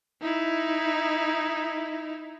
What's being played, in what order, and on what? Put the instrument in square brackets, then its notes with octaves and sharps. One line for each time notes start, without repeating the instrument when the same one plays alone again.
[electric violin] D#4 E4